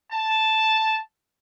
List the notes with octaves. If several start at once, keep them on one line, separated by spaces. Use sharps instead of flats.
A5